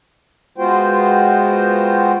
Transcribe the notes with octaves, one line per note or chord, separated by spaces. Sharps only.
G#3 B3 F4 F#4 C5 G5